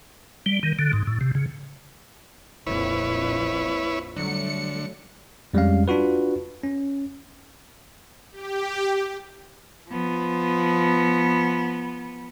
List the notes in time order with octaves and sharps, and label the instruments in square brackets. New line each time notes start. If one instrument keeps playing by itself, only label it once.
[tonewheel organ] G3
D#3
D3
G#2
A2
C3
C#3
[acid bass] D1 [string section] A#1 F2 F3 [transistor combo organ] E4 B4 C#5
[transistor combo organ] D3 [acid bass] F#3 [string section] G3 A3 C#7
[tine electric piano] F2 G3 G#3 C#4 F5
D4 F4 F#4 B4
C#4
[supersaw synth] G4
[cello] F3 B3